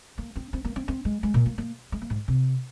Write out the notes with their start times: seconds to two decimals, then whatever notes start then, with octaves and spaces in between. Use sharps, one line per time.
0.18 A#3
0.36 C4
0.53 C4
0.65 A#3
0.76 C4
0.88 C4
1.05 G#3
1.23 G#3
1.34 A#2
1.46 A#3
1.58 A#3
1.92 G#3
2.02 A#3
2.10 G#2
2.28 C3